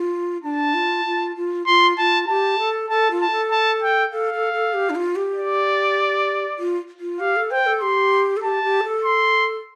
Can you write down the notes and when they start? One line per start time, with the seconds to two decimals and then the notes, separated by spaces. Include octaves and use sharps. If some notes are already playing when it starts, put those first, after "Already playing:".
Already playing: F4
0.43 D4 A5
0.74 F4
1.05 F4
1.36 F4
1.66 F4 C6
1.97 F4 A5
2.28 G4 A5
2.59 A4
2.90 A4 A5
3.11 F4
3.21 A5
3.31 A4
3.51 A5
3.82 G5
4.12 A4 F5
4.33 A4
4.53 A4
4.74 G4
4.90 D4
4.95 F4
5.16 G4
5.35 D5
6.59 F4
7.00 F4
7.20 G4 F5
7.36 A4
7.51 C5 G5
7.66 A4
7.81 G4 C6
8.37 A4
8.43 G4 A5
8.64 G4
8.84 A4
9.04 C6